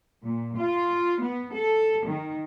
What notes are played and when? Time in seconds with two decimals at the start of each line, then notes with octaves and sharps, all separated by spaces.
0.22 A#2
0.56 F4
1.20 B3
1.53 A4
2.05 D#3